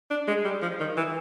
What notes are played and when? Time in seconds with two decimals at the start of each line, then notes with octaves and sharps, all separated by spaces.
0.11 D4
0.28 G#3
0.45 G3
0.62 F3
0.80 D#3
0.97 E3